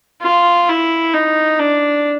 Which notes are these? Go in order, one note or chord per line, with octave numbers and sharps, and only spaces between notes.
F4
E4
D#4
D4